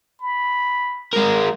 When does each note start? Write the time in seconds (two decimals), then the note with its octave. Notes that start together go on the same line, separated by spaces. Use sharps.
0.21 B5
1.13 G#3 A#4